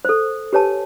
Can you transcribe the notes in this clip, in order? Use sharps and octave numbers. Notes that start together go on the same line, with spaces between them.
A4 C5
G4 B4 C#5 G#5 A5